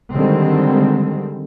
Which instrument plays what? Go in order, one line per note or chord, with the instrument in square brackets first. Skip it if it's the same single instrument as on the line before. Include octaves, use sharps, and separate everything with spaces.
[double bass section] D3 D#3 G3 G#3 C4